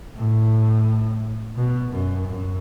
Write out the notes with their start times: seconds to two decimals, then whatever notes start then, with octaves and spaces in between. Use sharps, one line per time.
0.17 A2
1.57 B2
1.92 F#2
2.26 F#2